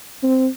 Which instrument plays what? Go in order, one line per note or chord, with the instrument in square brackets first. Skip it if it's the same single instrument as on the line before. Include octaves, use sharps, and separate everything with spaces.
[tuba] C4